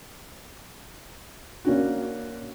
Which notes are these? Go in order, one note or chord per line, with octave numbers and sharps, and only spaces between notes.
A#3 C#4 D4 F#4